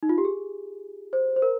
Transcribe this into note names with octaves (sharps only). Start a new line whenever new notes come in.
D#4
F4
G4
G#4
C5
C5
A#4